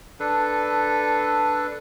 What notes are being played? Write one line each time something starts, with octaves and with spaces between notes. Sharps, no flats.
D4 A4 B4